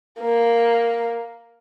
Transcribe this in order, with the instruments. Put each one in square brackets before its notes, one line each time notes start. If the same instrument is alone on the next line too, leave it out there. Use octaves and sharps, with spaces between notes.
[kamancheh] A#3